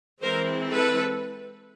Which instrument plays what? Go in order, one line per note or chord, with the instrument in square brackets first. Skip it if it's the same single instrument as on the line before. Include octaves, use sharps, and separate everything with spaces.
[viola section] E3 G#3 C4 E4 A#4 C5
A4 B4